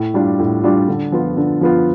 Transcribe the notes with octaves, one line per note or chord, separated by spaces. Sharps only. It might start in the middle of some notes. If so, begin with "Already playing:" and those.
Already playing: A2
G3 D4 F4
A2
G3 D4 F4
D3
F3 B3 F4
D3
F3 B3 F4